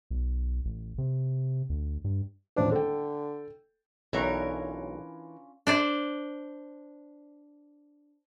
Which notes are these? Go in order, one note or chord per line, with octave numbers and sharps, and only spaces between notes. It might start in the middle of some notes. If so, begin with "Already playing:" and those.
B1
A1
C3
D2
G2
D#1 A1 D4 C5
D3 A4 G5
B1 E3 C#4 D4 F4 A#4 C#5 A#5
D4 C5 D5